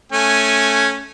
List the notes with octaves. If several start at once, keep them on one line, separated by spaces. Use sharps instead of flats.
A3 C#4 G#5